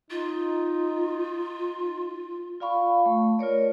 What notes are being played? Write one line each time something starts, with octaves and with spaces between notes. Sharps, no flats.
D#4 F4
F4 D5 F5 B5 C#6
A3
F4 A#4 C#5 D5